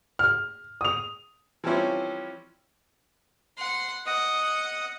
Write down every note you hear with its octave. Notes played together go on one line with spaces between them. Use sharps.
F6
D#6 F7
E3 F3 G3 C4 C#4 E4
F#5 C6
D#5 F#5 D#6